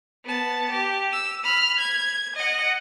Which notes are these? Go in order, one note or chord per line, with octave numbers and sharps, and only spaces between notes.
B3 A5
G4
E6
B5 F6
G#6
D#5 F#5